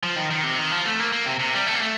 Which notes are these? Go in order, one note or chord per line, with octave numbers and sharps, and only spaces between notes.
F3
D#3
D#3
C3
D#3
F3
A3
A#3
A#3
C3
C3
G3
A3
A#3
A3